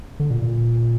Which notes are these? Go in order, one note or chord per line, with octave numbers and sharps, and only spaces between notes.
D3
A#2
A#2